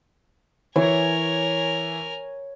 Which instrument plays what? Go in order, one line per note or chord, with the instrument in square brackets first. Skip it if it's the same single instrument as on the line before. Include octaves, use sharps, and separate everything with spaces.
[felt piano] E3 [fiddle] A#4 G#5 [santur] C#5